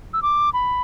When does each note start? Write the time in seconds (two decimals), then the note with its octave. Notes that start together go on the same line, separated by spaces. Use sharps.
0.13 E6
0.22 D6
0.53 B5